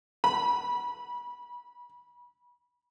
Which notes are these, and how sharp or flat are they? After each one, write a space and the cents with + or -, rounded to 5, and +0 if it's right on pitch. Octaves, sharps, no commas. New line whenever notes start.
B5 -30